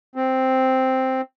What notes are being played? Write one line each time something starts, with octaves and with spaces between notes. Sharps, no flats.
C4